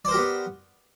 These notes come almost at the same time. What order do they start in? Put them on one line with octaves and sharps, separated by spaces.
D5 C5 A#4 G4 B3